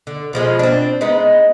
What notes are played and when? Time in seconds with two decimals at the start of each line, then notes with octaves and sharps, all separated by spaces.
0.07 D3
0.33 B2 F3 G#3
0.59 C4 D4
1.01 G#3 B3 D#4